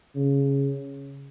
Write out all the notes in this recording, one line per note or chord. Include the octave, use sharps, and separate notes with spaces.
C#3